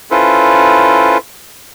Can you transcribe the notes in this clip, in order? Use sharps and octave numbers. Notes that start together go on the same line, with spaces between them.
C#4 E4 F4 A4 B4 C5